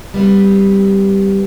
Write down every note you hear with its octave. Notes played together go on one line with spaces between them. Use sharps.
G3 B3 C4